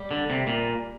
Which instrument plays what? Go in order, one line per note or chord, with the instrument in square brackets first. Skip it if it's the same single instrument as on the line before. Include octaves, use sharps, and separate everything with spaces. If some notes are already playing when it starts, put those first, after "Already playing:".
Already playing: [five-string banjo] G3
[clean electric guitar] D3
C3
A#2